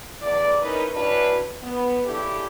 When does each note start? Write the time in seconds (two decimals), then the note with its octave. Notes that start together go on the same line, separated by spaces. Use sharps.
0.22 E2 A2 D5
0.61 C#4 D#4 E4 A#4 B4 D#5
0.93 C#4 D4 E4 F#4 B4
1.62 B3
2.05 C#3 A3 D4 E4 G4 A4